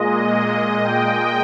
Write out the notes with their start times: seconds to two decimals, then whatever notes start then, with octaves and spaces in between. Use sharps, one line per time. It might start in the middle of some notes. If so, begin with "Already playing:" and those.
Already playing: A#2 G#3 D#5
0.33 D#5
0.83 G5